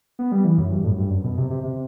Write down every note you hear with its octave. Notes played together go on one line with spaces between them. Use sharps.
B3
G3
E3
F#2
G2
A2
F#2
G2
F#2
B2
C3
C3
C3